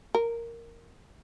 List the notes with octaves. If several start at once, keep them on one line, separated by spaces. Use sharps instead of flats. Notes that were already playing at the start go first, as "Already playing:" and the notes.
A#4